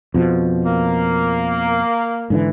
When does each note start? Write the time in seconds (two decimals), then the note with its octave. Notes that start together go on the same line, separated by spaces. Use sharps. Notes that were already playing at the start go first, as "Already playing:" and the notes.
0.14 F2 B2 F3
0.65 A#3
2.30 G#2 D3 E3